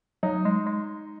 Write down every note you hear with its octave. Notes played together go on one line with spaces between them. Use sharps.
F#3 D#4
G#3
G#3